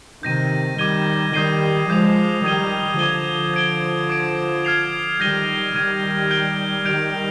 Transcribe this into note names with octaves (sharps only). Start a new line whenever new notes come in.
C3 D#3 G6 A#6 D#7
D#3 G3 D6 G#6 D#7 G7
D#3 G3 D#6 G6 C7 D#7 G7
F3 G#3 D6 G6 C7 F7
D#3 G3 D#6 G#6 D#7 G7
D3 F3 D6 G#6 D#7 G7
G#6 D7 G7
D6 G#6 D7
F6 G#6 C7 F7
D#3 G3 G6 A#6 D#7 G7
D#3 G3 F6 G#6 D#7
G6 D7 G7
D#3 G3 G6 D7 F7